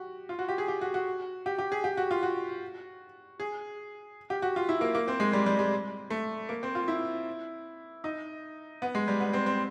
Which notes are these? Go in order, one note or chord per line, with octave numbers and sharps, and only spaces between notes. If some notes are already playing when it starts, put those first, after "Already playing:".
Already playing: F#4 G4
F4
F#4
G4
G#4
G4
F#4
F#4
G4
G4
G#4
G4
F#4
F4
F#4
G#4
G4
F#4
F4
E4
A#3
A#3
C4
G#3
G3
G3
G#3
A3
A#3
C4
F4
E4
D#4
B3
G#3
G3
B3
C4
C4